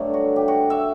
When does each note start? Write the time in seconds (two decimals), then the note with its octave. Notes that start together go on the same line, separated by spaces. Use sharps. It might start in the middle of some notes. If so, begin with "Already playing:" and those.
Already playing: G2 D3 F#3 A3 E5
0.14 F#4
0.36 G4
0.48 F#4
0.70 E5